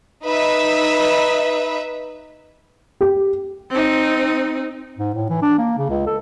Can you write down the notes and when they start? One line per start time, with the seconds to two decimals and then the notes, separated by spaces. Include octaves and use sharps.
0.24 D#4 B4 E5
3.01 G4
3.70 C4 D#4
4.98 G#2
5.14 A2
5.30 E3
5.42 D4
5.58 A#3
5.78 C#3
5.89 C#2
6.06 A4